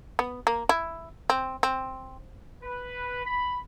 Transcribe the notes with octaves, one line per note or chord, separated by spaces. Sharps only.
B3
A#3
E4
C4
C4
B4
B5